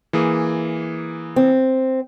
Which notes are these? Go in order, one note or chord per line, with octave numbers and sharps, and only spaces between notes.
E3 A#3 G#4
C4